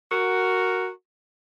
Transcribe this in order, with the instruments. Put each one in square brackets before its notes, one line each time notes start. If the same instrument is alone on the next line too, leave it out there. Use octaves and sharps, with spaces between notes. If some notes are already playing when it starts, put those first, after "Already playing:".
[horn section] F#4 A#4